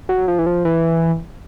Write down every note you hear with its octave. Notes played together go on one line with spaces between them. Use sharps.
F#3
F3
E3
F3
E3